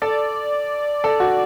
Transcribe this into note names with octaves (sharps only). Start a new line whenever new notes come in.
A4 D5
A4
F#4